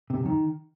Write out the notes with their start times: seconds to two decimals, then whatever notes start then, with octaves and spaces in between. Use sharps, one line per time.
0.10 C3
0.18 F#2
0.25 D#3